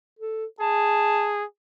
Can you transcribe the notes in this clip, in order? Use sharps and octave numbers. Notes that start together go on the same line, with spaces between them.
A4
G#4 A5